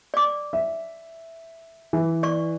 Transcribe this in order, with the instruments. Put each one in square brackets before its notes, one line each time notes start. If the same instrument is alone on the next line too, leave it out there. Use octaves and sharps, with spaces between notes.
[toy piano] D5 D6
[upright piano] E5
E3
[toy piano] D5 C#6